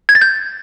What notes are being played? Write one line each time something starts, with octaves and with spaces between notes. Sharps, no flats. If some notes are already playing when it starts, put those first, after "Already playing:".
G#6
A6
G6